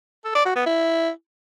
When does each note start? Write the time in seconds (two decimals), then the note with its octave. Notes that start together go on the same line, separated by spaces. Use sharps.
0.25 A4
0.35 D5
0.45 F#4
0.56 B3
0.66 E4